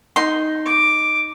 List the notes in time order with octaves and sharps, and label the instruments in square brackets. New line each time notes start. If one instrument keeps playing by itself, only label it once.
[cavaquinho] D#4 C6
[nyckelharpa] D6